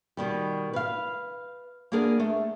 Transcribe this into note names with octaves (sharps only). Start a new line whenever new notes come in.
B2 D#3 G3
B4 F5
A#3 B3 D4 G#4 A#4
A3